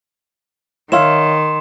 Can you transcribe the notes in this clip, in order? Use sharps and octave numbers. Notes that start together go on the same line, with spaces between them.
D#3 C#5 E5 F5 C6 E7